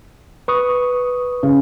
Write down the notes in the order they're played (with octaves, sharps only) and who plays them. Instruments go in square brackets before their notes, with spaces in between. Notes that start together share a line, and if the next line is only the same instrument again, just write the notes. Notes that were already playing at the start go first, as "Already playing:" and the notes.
[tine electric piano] B4 C#6 D#6
[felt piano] C#3